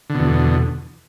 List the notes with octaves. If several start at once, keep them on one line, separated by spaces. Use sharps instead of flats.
E2 B2 D3